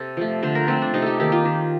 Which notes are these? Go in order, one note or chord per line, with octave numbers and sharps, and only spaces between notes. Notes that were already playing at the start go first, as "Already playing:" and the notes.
Already playing: C3 A4 C5
F3 A3
D3 C5
A#4
F3 A3 C4
D4
C3 D#4
G4 A4
D#3 A#3 G4
F4
D#3